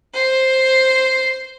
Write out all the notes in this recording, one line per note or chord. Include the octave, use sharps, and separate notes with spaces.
C5